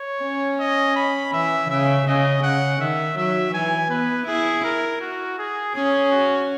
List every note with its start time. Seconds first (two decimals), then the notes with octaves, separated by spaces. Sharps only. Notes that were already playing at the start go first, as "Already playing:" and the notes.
Already playing: C#5
0.23 C#4
0.60 D#5
0.96 B5
1.33 E3 E5
1.70 C#3 E5
2.07 C#3 D#5
2.43 C#3 F#5
2.81 D#3 E5
3.17 F#3 E5
3.54 E3 G#5
3.90 B3 B4
4.27 E4 G#4
4.64 A#4
5.01 F#4
5.38 G#4
5.75 C#4 G#4
6.11 F#4